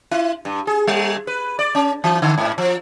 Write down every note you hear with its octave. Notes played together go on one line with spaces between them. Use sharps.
E4
G2
G#4
G3
B4
D5
C#4
E3
D3
G#2
F3